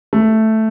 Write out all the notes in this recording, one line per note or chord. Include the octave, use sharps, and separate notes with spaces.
A3